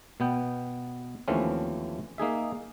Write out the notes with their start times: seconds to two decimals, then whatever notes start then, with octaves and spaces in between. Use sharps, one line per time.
0.20 B2 B3 G5
1.28 D#2 E3 F3 A3 C4 C#4
2.18 A#3 D#4 G#4 E5